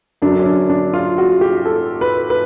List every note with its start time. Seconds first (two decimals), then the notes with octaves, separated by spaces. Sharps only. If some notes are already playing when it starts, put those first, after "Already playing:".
0.22 F#2 D3 F#3 D4
0.40 C#4
0.46 D4
0.70 D4
0.94 F4
1.18 F#4
1.41 G4
1.65 A4
2.01 B4
2.30 B4